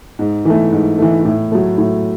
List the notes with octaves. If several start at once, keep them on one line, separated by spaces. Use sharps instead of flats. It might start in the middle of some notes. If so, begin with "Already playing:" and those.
G#2
E3 A3
G#2
E3 A3
A2
F#3 A3
A2